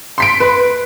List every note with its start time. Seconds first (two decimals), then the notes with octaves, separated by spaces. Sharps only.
0.18 C6 B6 D7
0.40 B4